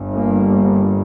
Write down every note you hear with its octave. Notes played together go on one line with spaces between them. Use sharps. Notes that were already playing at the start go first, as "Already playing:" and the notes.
Already playing: G1 G2
A#3